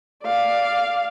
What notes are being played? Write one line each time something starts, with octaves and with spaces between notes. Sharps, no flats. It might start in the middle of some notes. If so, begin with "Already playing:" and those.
D5 F5